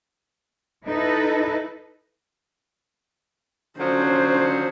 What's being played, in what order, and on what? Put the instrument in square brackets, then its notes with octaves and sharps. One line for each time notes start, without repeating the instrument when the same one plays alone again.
[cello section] D#4 E4 A4 B4 D#5
[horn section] D3 F3 F#3 [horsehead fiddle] C#4 C5